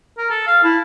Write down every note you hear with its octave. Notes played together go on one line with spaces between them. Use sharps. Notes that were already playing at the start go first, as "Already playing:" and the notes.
A#4
A4
F5
E4 A5